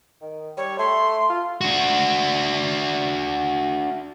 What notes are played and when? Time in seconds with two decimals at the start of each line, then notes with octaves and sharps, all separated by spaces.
0.22 D#3
0.57 G3 C#5
0.79 A3 C6
1.30 F4
1.61 D4 F#4